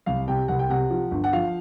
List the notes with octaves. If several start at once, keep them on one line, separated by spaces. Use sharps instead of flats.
C2 F5
C3 G5
C2 F#5
G5
C3 F#5
F3
G1
F#5
F3 F5